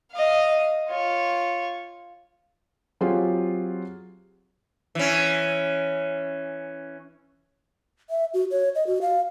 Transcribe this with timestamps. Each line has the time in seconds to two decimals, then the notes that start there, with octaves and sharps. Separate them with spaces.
0.12 D#5 F5
0.89 F4 C#5
3.01 F#3 C4 F4 G4 G#4
4.95 E3 C#4
8.10 E5
8.34 F#4
8.51 C#5
8.75 D#5
8.87 F#4
9.02 F5